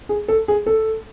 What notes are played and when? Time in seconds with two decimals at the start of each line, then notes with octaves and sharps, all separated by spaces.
0.09 G#4
0.28 A4
0.48 G#4
0.66 A4